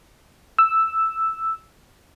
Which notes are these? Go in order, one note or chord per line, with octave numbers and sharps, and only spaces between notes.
E6